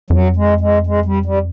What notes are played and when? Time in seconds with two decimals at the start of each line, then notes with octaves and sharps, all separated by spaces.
0.10 F2 F#3
0.36 G#3
0.61 G#3
0.87 G#3
1.05 G3
1.25 G3